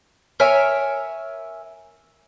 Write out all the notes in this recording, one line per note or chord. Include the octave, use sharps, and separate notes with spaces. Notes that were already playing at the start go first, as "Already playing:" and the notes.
A#4 C#5 E5 G#5